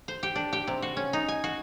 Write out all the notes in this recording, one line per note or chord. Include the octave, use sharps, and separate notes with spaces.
C5
G4
D4
G4
C3
F#4
C#4
D#4
G#5
F#4